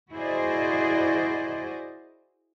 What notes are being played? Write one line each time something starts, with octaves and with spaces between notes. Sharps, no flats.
E4 F#4 G#4 C5 D5 D#5